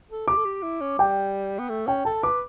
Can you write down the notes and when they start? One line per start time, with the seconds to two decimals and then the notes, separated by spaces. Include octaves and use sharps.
0.10 A4
0.28 G4 D6
0.37 A4
0.45 G4
0.63 E4
0.81 C#4
0.99 G3 G5
1.59 B3
1.69 A3
1.87 C#4 G5
2.05 A4 A5
2.23 B4 D6